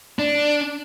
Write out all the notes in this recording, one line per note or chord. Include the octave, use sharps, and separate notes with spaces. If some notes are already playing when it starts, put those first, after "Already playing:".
D4